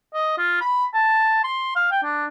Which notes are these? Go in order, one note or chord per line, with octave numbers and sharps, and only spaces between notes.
D#5
F4
B5
A5
C6
F5
G5
D4